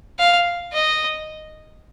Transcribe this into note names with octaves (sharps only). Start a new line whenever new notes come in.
F5
D#5